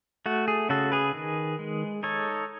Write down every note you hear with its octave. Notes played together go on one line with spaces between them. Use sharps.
A3 F#4
G#4
C#3 F#4 A4
G#4 B4
D#3
G#3
D#4 A4 C#5